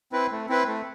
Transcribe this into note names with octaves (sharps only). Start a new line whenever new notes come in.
C4 E4 B4
A3
C4 E4 B4
A3